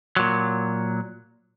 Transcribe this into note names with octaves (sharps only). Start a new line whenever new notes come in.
A#2 F#3